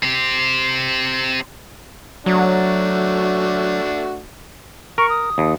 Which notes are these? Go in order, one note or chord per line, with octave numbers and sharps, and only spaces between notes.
C4 G4
F#3 A3 D4 F#4
A#4 C#6
D#6
D#2